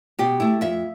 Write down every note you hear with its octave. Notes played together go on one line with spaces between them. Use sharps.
B2 G4
A3 E4
F2 E5